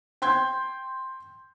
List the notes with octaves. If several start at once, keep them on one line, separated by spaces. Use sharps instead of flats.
G5 C6 G6 G#6